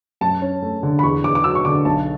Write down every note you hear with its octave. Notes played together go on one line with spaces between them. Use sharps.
F#2 A5
C#4
A3
D3
B5
E2 C#6
E2 D6
D6
F#3 E6
C#6
D3 D6
B1 A5